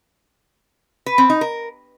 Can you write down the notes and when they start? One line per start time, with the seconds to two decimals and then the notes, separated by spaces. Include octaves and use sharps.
1.06 B4
1.18 C4
1.30 D#4
1.41 A#4